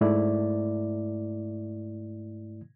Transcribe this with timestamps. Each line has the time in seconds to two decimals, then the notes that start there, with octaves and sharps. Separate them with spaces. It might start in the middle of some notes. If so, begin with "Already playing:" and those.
0.01 G#2 A3 E4 D5